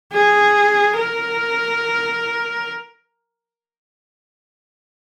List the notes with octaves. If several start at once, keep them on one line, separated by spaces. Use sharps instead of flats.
G#4
A#4